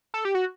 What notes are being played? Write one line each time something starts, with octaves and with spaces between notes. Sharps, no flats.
A4
G4
F#4